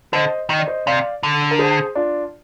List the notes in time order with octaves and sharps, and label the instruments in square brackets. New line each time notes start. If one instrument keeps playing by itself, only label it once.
[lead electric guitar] D3 [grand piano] C5 D#5
[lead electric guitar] D#3 [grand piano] D#5
[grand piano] D5
C5 D#5
[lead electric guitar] C3 [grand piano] D5 F5
[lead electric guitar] D3
[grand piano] A#4
G#4 C5
D4 F4